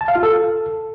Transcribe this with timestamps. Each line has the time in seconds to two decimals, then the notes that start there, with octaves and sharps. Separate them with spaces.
0.01 A5
0.08 F5
0.16 F4
0.23 A4